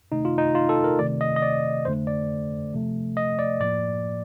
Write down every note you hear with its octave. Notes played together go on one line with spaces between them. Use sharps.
C3 D#3 A3 D#4
F4
D#4
F4
A4
A#4
C3 D#3 A3 D5
D#5
D#5
D5
F2 D3 A3 C5
D5
C3 F3 A3
D#5
D5
A2 F3 A#3 D5